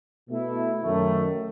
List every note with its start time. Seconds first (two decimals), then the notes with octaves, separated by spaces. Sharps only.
0.29 B2 A3 E4
0.83 F#2 D#3 A3